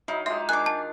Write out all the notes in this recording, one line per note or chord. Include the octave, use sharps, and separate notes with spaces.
F#3 D#4 E4 F5
G#3 F4 G4 E5 C6
D#3 D4 G#5 D6 F#6
A5